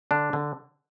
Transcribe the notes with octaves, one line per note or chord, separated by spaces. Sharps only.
D3 D4
D3